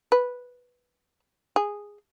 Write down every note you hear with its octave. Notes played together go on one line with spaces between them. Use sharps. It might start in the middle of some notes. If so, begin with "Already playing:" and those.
B4
G#4